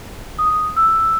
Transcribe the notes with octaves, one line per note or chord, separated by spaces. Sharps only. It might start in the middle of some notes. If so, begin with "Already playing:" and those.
D#6
E6